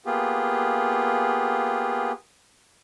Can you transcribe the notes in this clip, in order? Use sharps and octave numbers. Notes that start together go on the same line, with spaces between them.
A#3 B3 F4 G4 G#4